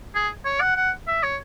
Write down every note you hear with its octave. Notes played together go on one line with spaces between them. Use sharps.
G#4
C#5
F#5
F#5
E5
C#5